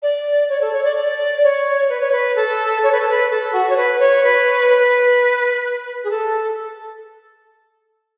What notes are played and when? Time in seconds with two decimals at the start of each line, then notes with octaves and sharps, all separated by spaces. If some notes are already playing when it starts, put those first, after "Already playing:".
0.02 D5
0.49 C#5
0.61 A4
0.72 C#5
0.84 D5
0.96 D5
1.43 C#5
1.89 B4
2.00 C#5
2.11 B4
2.35 A4
2.83 C#5
2.91 B4
3.00 A4
3.09 B4
3.29 A4
3.52 F#4
3.69 C#5
3.76 B4
3.99 C#5
4.23 B4
4.69 B4
6.03 G#4
6.09 A4